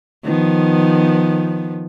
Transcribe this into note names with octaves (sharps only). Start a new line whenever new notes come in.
D#3 F3 B3